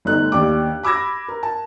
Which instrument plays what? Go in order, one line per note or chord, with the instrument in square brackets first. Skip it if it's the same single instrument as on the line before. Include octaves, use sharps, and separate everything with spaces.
[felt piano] G1 A3 D#4 F#6
D#2 D4 D6
B5 D6 E6 G#6 A#6
A#4
A5